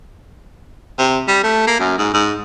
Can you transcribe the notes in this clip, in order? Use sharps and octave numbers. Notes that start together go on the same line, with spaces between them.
C3
G3
A3
A#3
F#2
G#2
G#2